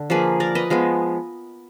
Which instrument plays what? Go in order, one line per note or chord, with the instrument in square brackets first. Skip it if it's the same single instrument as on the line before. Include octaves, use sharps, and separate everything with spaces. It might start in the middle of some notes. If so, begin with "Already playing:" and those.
Already playing: [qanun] D3
F3 A#3 G#4 B4
A#4 D5
B4 D#5
F3 G#3 B3